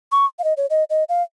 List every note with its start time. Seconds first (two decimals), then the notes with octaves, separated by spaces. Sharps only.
0.12 C#6
0.39 F5
0.44 D#5
0.57 C#5
0.70 D#5
0.90 D#5
1.09 F5